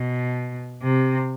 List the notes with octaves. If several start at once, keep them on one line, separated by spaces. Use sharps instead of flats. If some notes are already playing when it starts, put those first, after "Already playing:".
Already playing: B2
C3